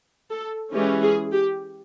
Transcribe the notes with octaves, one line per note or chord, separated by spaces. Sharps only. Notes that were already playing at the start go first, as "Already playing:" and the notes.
A4
E3 G#3 C#4 G4
G#4
G4